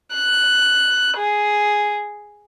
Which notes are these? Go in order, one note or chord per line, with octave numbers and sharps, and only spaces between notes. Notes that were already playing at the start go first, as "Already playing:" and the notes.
F#6
G#4